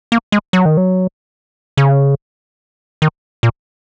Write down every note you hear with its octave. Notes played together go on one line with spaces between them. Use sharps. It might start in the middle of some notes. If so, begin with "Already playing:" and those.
A#3
G#3
F#3
D#3
F#3
C#3
D#3
A#2